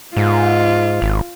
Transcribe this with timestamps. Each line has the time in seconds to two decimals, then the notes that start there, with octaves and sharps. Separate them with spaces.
0.17 G#2 F4
1.02 G#1